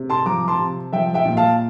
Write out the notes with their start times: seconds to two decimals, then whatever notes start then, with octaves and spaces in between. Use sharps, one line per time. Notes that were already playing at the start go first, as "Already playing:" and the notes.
Already playing: C3
0.10 A5 C6
0.26 F3 A#5 D6
0.48 A5 C6
0.59 C3
0.93 F3 E5 G5
1.14 E5 G5
1.25 A#2
1.37 F5 A5